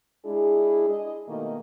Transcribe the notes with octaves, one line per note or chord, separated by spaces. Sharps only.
G#3 D4 E4 G#4
G#4 D#5
B2 D#3 A3 A#3 D#5